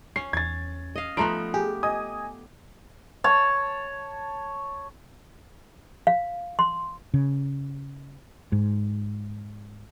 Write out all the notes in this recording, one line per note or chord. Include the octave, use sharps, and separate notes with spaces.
C#4 C7
E2 G#6 A6
D#5 F5
F3 A3 B3 A#5 C6 D7
G4 G#4
D#5 G#5 D#6
C#5 A5
F5
C6
C#3
G#2